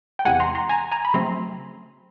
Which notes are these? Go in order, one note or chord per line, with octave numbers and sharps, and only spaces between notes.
G5
E2 C3 E3 G#3 F#5 G#5
A#5 C6
A#5 C6
G#5 A#5
G#5 A#5
B5
C#3 F#3 A3 C4 A#5 C6